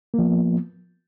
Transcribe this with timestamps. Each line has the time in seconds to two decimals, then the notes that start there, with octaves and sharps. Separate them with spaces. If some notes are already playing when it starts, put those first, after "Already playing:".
0.14 A#3
0.19 F3
0.23 B3